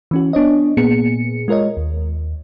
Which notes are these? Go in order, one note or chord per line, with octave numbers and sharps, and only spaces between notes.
E3 C#4 F#4
B3 D4 C#5 D#5
A#2 A#3 B3 G#4 C#7
G#3 F4 A#4 C#5 D#5
D#2